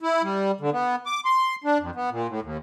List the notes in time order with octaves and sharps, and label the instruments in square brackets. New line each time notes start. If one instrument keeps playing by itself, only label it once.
[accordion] E4
G3
D3
B3
D6
C6
D4
F2
B3
A#2
A2
D#2